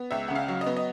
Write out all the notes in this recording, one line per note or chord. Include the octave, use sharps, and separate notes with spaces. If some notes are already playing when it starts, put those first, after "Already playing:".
Already playing: B3
C#2 E5
C#3 F#5
F5
F#3
D#5
B3
D#5